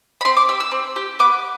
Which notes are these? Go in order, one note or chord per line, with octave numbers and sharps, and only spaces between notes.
B5
C4 C6
D6
G4 E6
E6
C4
G4
B3 D6